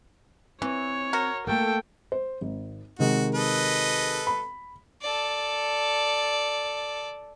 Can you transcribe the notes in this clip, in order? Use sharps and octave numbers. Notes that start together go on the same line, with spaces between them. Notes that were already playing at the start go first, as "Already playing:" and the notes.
E3 C4 C#5
F#4 A#4
A3 A#3 A4 G5
C5
G#1
C3 D#3 G#3 F#4
A4 B4 D#5
B5
A4 D5